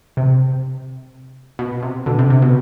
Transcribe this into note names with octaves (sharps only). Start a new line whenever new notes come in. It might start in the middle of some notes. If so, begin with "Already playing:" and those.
C3
B2
C3
B2 D3
C3
C3
B2